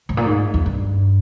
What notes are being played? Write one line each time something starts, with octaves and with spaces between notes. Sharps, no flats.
G#2
A#2
G#2
E2
G2